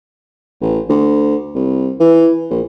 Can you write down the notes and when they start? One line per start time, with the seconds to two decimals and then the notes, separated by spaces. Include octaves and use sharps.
0.61 A1
0.89 D2
1.55 C2
2.00 E3
2.50 A#1